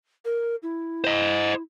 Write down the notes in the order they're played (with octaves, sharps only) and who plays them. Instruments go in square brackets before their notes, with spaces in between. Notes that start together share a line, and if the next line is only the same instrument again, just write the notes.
[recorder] A#4
E4
[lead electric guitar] C5 D#5